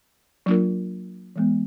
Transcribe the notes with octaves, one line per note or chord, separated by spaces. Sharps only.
F#3 A#3 D4 F4 A#4
E3 G#3 B3